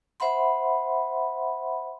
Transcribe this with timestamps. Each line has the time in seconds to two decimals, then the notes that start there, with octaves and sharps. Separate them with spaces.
0.20 C5 E5 F#5 B5 C6